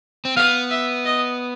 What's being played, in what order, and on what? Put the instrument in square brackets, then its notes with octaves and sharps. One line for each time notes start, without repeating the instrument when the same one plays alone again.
[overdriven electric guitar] C4
[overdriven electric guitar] B3 [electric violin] F5
[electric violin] E5
D#5